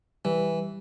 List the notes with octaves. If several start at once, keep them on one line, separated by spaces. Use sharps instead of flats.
E3 G3